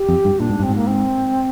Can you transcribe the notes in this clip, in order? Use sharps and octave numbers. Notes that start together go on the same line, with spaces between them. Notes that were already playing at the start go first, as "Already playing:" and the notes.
Already playing: G4
F2
G2
A#2 D4
G#2
G2 C4
G#2
A#3
C4